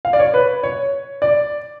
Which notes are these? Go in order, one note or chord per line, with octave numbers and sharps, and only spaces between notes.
F5
D5
C#5
B4
C#5
D5